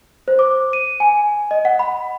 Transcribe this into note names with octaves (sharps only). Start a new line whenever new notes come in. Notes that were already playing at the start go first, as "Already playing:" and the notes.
C5
D6
D#7
G#5
D#5
F#5
B5